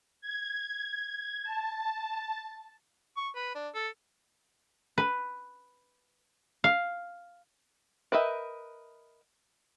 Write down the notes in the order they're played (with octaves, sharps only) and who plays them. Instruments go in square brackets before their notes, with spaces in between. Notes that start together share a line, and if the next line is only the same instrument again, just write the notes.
[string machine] G#6
A5
[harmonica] C#6
B4
D4
A4
[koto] B4
F5
[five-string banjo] A#4 B4 D#5 E5 G5